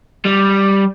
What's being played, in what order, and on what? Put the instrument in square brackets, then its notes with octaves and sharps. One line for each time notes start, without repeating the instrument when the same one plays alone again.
[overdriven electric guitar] G3